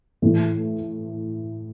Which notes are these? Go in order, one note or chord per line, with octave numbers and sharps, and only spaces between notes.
A2 E3 A3